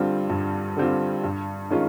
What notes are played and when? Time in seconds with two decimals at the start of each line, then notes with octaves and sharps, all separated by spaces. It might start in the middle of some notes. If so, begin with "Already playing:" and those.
Already playing: G2 D3 G3 C4 F4
0.30 G2
0.77 D3 G3 C4 F4
1.24 G2
1.70 D#3 G#3 C#4 F4